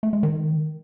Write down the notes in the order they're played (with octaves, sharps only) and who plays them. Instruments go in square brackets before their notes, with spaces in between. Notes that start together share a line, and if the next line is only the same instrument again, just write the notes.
[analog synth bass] A3
G#3
D#3